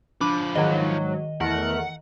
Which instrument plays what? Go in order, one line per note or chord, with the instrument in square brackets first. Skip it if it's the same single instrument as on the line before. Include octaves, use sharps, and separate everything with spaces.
[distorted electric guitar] F3 B4 [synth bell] D4 B5 D6
[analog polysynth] G#2 F#3 [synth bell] D#3 D#5
[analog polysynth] E2 A3 A#4 [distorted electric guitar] F#5